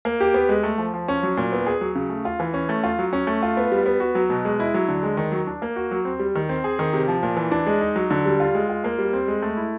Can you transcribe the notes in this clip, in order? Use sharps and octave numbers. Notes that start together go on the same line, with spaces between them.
A#3
G4
B3
G#3
A3
F3
F3
C#4
F#3
A#2
B3
G#4
F#3
C#3
A3
F4
E3
C#4
A3
F4
F#3
C#4
A3
F4
B3
G3
B3
F#4
F#3
B2
G#3
E4
F#3
D3
G#3
D#3
F#3
D4
A#3
F#4
F#3
C4
G3
D#3
C4
G#4
D#3
C3
F3
A#2
E3
D4
G#3
D#4
F#3
D3
G3
F4
G#3
F4
A#3
G3
C4
G#3
A3
E4